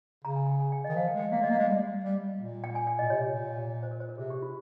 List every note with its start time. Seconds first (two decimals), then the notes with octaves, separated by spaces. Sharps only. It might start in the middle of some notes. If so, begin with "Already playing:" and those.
0.24 C#3 A#5
0.36 G#5
0.49 G5
0.60 G#5
0.72 G5
0.84 D#5
0.88 D#3
0.96 F3 F5
1.08 G5
1.14 G#3
1.19 G5
1.32 A#3 F5
1.41 G#3
1.44 D#5
1.50 A#3
1.55 G#3 F5
1.68 G3
2.04 G3
2.39 A#2
2.64 G5
2.75 G#5
2.87 G5
2.99 D#5
3.02 A#2
3.10 C3 C#5
3.29 A#2
3.83 C5
3.91 A#4
4.00 C5
4.09 A#4
4.18 C3 G#4
4.30 G4
4.42 F4